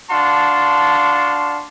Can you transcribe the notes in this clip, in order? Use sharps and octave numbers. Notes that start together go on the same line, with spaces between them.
D4 F#4 F5 A5 C6